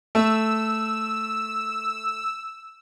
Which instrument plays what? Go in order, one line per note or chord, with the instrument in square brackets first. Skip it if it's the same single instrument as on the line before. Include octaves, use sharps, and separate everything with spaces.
[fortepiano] A3 [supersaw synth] E6